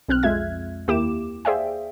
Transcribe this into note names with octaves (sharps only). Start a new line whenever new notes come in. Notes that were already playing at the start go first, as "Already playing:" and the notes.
B1 C4 F6 F#6
F2 G#3 F4 E5 G#6
D#2 A#3 E4 G4 D6 E7
G#4 C5 D5 E5 F5 G5